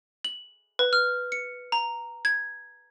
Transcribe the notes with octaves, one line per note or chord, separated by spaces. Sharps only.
F#7
B4
F6
C#7
A#5
G#6